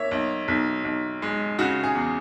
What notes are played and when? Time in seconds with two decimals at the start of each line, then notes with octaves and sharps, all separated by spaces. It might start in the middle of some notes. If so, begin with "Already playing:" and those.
Already playing: A#3 C#5 E5
0.11 B1
0.48 B1
0.85 B1
1.22 G#3
1.59 C#3 F#4
1.83 G#4
1.95 E2